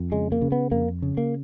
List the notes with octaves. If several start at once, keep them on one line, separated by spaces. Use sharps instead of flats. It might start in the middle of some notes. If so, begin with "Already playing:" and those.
Already playing: F2
C#3 G#3
A#3
C#3
B3
F2 A#3
C#3
A#3